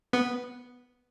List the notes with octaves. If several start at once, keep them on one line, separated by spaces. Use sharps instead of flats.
B3